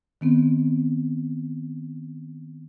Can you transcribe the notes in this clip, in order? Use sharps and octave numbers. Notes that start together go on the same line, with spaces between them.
D#3 B3 C4